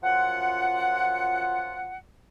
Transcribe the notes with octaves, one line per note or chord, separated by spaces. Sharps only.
F#2 F3 F4 F#5